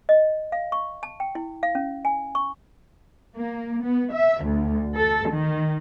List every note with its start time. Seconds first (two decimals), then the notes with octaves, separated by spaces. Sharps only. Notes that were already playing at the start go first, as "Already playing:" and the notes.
0.09 D#5
0.52 F5
0.72 C#6
1.03 A5
1.20 G5
1.35 E4
1.63 F5
1.75 C#4
2.05 G#5
2.35 C#6
3.36 A#3
3.83 B3
4.13 E5
4.43 D2
4.97 A4
5.31 D#3